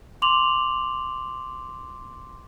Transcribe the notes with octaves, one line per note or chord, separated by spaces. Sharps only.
C6 D6 F7 F#7